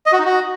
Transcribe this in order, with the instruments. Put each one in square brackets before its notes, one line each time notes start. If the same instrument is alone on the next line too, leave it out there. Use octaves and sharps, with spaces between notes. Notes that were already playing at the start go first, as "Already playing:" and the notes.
[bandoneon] D#5
F#4
D#4
F#4